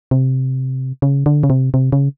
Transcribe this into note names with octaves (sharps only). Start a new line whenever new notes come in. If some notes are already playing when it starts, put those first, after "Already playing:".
C3
C#3
D3
C#3
C3
C3
C#3